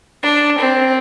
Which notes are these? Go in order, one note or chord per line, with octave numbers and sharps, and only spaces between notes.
D4
C4